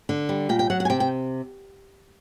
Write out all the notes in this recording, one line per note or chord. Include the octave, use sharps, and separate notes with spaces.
D3
G3
A#2 G5
G5
F#3 F#5
F#5
G#5
C3 G5
G5